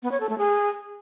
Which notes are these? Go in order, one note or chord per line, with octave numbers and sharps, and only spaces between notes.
B3
C#5
A4
A3
G#4